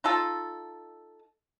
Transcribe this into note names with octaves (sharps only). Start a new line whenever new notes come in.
D#4 F4 A4